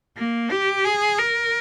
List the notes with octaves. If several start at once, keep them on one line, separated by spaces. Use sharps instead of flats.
A#3
G4
G#4
A#4